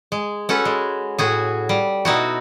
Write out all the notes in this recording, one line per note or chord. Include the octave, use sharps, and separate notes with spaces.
G#3
C#4 F#4 A4 B4
G#3
A2 F#4 G#4
G3
B2 D#4 E4 F#4